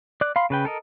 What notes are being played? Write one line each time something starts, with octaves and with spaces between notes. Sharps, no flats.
D5 F#6
F5 B5 C6
C#3 B4 G5
A4 A#4 D#5